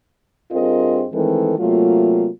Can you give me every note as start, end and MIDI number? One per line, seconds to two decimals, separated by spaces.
0.52 1.04 43
0.52 1.04 60
0.52 1.04 65
0.52 1.04 68
0.52 1.04 70
0.52 1.04 75
1.13 1.53 51
1.13 1.53 52
1.13 1.53 56
1.13 1.53 57
1.13 1.53 60
1.13 1.53 69
1.58 2.28 48
1.58 2.28 54
1.58 2.28 57
1.58 2.28 58
1.58 2.28 65